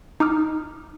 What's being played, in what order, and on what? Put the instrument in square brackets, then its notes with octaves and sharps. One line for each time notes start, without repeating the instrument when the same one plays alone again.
[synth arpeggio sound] D#4 D6 D#6 F6